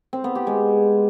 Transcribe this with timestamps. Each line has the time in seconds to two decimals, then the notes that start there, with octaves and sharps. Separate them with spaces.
0.13 C4
0.24 B3
0.35 G4
0.47 G#3